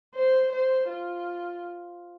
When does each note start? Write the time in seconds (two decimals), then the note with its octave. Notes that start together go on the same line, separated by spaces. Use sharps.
0.15 C5
0.52 C5
0.89 F4